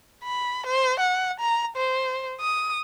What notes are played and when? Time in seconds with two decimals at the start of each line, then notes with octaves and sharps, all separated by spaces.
0.24 B5
0.67 C5
1.00 F#5
1.40 A#5
1.76 C5
2.41 D#6